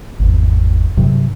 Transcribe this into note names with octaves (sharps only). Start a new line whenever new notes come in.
G#1 E2
G2 C3 F#3